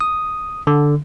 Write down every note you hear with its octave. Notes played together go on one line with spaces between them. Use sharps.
D#6
D3